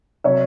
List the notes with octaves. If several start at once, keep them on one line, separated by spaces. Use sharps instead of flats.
C3 F#3 C#5 E5